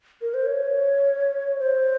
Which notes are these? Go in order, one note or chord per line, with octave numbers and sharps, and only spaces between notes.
A#4
C5
C#5
C5